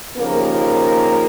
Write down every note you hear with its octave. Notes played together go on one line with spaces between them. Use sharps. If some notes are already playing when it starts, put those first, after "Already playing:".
D#2 C#3 F3 A#3